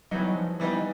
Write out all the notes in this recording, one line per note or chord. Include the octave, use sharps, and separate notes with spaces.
E3 F#3 G3 B3 D#4
F3
E3 G3 B3 D#4